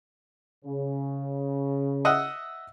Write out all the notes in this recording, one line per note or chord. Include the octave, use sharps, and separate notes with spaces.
C#3
D#5 E5 F#5